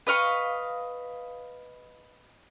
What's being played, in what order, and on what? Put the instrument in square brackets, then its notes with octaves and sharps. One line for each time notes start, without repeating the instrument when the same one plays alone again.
[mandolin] B4 D#5 F5 C#6